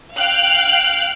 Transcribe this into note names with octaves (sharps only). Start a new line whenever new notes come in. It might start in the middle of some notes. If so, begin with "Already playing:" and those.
F5 G5 F6 F#6